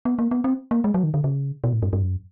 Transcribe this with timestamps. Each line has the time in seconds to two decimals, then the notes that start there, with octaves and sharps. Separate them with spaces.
0.05 B3
0.19 A#3
0.31 B3
0.44 C4
0.71 A#3
0.84 G#3
0.94 F#3
1.03 D#3
1.14 D3
1.24 C#3
1.64 B2
1.73 A2
1.82 G2
1.93 G2
2.02 F#2